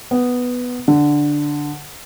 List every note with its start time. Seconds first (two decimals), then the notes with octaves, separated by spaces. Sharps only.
0.11 B3
0.88 D3